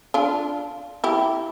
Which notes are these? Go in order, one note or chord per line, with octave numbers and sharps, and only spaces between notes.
D4 F4
E4 G4